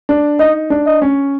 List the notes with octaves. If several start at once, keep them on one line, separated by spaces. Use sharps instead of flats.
D4
D#4 D#5
D4
D#5
C#4